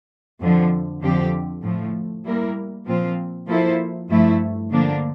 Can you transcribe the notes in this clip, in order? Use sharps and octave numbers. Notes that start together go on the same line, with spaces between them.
F2 D3 F3
F2 D3 F3 C4 G4
A2 F3 A3
G3 A#3 E4 A#4
A#2 F3 C4 F4
F3 A#3 E4 A4 C5
G2 F3 A3 E4
D3 F3 A#3 D4